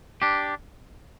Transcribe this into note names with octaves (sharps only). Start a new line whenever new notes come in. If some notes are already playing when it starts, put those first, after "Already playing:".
D4 G4